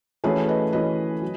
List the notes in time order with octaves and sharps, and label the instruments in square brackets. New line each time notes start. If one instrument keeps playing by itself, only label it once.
[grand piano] E3 A3 C#4 F#4 [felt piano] G#4 B4
[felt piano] B4 D#5
[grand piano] E3 A3 C#4 F#4 [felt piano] B4 D#5
[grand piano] F#3